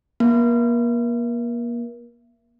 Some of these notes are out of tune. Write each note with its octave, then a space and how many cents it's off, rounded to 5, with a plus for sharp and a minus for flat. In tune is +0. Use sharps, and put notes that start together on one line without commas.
A#3 +35